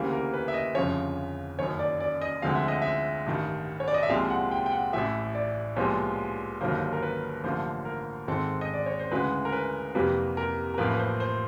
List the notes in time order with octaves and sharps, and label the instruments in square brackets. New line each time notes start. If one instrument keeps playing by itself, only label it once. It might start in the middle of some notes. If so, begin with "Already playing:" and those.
Already playing: [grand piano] D2 C#3 E3 G3 A#3
A#4
B4
E5
D#5
G1 F2 C#3 F3 C#5
F#1 F#2 D#3 C#5
D5
D5
D#5
D2 D3 F3 G#3 C4 F5
E5
D#5
E5
A1 G2 D#3
C#5
D5
D#5
E5
C2 A#2 F3 G#3 C4 F5
F#5
G5
G5
F#5
A1 A2 E3 E5
D5
C2 A#2 F3 G#3 B3 C#5
G1 G2 D#3 F#3 A#3 C5
A#4
B4
A1 G2 D3 F3 A#3 C5
A#4
G#1 G#2 D#3 G#3 C4 A4
D#5
D5
C#5
C5
D2 C#3 E3 G#3 B4
A#4
B4
F2 C3 E3 G3 A#3 B4
A#4
A#4
A1 A2 F3 A#3 B4
B4
C5
C5